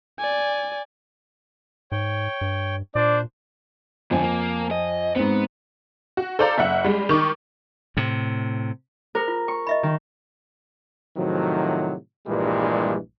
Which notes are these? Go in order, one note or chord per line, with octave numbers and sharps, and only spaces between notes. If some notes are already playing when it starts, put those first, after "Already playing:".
D5 G#5
G#2 C#5 G5
G2
A#2 D4 C5 D5
F2 G#2 D3 G#5
A#3
D#5
G#2 B3 C4
F#4
A4 C5 D5 F5 A#5
F#1 E5 F#5
G3 G#3
D#3 C#6 D6
A2 C3
G#4 A#4 C5
F4
C#6
D#5 E5 B5
D#3
A2 C3 D#3 F3 F#3
A#1 G2 A#2 E3 G3 G#3